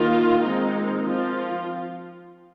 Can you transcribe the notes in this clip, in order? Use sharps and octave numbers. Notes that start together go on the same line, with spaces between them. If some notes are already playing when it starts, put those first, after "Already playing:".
Already playing: D#3 A#3 F4
D#3 G#3 C4 D#4
F3 C4 F4